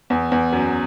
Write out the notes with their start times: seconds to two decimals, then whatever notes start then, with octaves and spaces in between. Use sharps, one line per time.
0.10 E2
0.32 E2
0.52 F#2